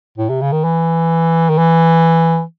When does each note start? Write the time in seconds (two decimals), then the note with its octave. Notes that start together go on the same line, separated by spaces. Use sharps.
0.18 A2
0.29 C3
0.41 C#3
0.52 D#3
0.64 E3
1.50 D#3
1.58 E3